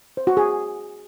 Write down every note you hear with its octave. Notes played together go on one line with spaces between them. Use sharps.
C5
F#4
G#4